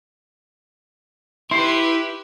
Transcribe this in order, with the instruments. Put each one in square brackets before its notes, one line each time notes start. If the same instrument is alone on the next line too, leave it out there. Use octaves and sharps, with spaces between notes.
[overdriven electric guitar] E4 [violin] G4 B4 [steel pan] C6